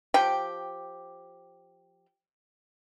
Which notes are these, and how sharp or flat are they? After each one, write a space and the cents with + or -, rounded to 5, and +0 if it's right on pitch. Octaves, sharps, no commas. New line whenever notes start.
F3 +10 G4 +0 G5 +0